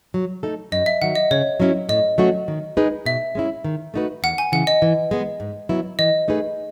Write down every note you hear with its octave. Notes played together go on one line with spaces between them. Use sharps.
F#3
A3 D#4 A4
F#2 D#5
E5
D#3 F#3 F#5
D#5
C#3 C#5
F#3 C#4 E4
A2 D#5
F#3 A3 C#4 F#4
D#3
G#3 D#4 G#4 B4
B2 E5
G#3 C#4 E4
D#3
A3 D#4 F#4 B4
E2 F#5
G#5
C#3 E3 F#5
D#5
E3
G#3 B3
G#2
F#3 B3 E4
E3 D#5
A3 D#4 G#4 B4